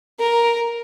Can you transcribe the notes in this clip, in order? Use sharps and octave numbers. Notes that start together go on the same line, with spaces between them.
A#4